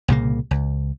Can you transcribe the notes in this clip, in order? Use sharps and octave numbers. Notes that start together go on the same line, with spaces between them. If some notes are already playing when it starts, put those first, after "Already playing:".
C2 A#2 C#3 A#3
C#2